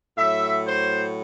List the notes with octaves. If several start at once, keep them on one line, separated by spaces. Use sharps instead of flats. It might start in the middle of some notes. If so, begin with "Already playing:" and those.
A2 F#3 E5
C5